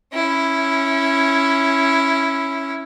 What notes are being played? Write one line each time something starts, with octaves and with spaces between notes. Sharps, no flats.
C#4 E4